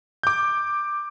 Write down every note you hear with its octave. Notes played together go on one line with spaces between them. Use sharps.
D6 G6